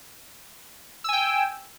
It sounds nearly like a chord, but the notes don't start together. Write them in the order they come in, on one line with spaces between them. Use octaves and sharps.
E6 G#5 G5